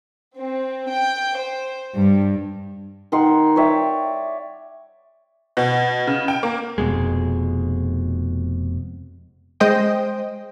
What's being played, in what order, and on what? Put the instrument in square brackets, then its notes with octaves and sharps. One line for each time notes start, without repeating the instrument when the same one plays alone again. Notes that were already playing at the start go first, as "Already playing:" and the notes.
[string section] C4
G5
C5
G2
[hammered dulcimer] D#3 D#4 F#5 C6
C#5 D5 E5 G5
[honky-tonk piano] B2
C#3
G5
A#3
[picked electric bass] F1 F2 B2 G#3
[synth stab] G#3 C5 D#5 G5